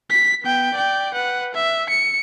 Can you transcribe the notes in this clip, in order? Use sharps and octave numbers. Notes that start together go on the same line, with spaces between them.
B6
B3 G5
D5 G5
B4 F#5
E5
C#7